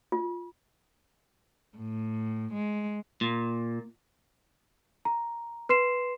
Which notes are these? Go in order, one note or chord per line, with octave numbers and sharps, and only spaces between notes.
F4
A2
G#3
A#2
A#5
B4 C6 C7 E7